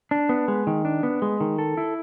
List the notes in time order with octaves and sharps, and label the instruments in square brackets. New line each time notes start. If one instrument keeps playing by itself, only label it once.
[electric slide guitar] D4
B3
G#3
D#3
D4
B3
G#3
D#3
A4
E4